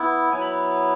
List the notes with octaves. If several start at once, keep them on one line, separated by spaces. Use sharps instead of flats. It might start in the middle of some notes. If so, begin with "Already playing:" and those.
Already playing: B3 E4
F#3 B3 E4 G#5
B5